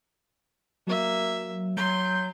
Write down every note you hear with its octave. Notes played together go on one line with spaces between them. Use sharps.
F#3 A#3 E5
F#3 C6 G6